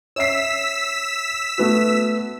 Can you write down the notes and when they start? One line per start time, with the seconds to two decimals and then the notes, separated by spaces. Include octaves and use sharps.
0.16 C#5 E5 E6 B6 C7
1.58 A3 B3 F#4